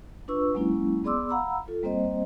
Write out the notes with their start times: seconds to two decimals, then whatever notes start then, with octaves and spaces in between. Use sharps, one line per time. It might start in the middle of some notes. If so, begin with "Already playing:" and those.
0.28 D4 F4 B4 C#6 E6
0.54 F#3 G#3 A#3 C#4 E4
1.04 B3 G#4 D5 C6 D6 E6
1.29 F5 F#5 A#5 B5 E6
1.68 F4 A4
1.83 G3 A#3 C4 C5 D#5